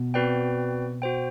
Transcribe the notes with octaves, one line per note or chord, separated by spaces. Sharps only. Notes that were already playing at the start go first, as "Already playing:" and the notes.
Already playing: B2
C4 F#4 B4 D5 G5
F#4 C5 G5